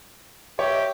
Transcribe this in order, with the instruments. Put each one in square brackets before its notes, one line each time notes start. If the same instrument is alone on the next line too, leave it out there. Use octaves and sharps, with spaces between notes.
[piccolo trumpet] G4 [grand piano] C#5 E5